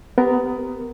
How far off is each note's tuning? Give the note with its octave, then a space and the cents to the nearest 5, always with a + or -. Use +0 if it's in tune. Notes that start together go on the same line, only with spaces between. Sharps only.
B3 +20 G4 +0 A#4 +0